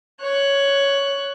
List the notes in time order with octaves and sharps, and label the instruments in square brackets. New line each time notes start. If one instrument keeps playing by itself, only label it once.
[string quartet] C#5 F#6